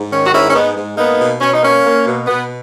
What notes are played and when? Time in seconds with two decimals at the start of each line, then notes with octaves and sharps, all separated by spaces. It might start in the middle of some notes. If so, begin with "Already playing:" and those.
Already playing: G#2
0.11 D#3 C#4
0.27 F#4
0.33 G#2 C#4 E4
0.48 C#4
0.54 G#3 B3 D#4
0.76 G#2
0.97 A#3 B3 D#4
1.19 B2
1.41 B2 C#4
1.52 D#4
1.62 A#3 C#4
1.84 A#3
2.06 B2
2.27 B2 B3